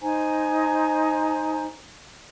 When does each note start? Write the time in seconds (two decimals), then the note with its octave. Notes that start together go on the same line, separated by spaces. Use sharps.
0.02 D#4 C5 G#5 A#5